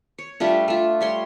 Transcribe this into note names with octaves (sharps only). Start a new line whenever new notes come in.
C#5
G3 A3 D4 F4
A3 F4
G3 C#5 C6